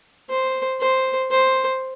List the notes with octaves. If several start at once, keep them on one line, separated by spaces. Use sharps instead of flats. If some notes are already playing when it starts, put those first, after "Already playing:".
C5
C5
C5